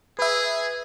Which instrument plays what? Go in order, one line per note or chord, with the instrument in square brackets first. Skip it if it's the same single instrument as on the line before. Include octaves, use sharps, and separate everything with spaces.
[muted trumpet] G#4 [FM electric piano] B4 E5